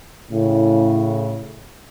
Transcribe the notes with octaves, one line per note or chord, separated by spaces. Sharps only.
A2 C#3